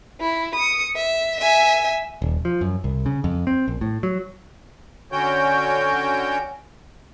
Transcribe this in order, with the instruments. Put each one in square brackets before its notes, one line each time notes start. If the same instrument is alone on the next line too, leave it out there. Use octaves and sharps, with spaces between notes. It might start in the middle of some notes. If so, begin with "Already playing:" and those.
[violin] E4
D#6 C#7
E5
E5 G#5
[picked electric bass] D#1
F3
F#2
C2
C#3
F2
C4
A#1
A2
F#3
[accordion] D3 C#4 F#4 C#5 G5 G6